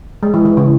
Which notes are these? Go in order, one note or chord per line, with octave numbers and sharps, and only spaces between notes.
G#3
E3
E3
C#3